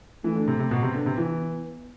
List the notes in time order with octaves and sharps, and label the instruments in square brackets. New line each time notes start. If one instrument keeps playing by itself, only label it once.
[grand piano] E3 [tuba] A3
[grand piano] D3
C3
C3
[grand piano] B2 [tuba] B3
[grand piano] C3
D3
C3
E3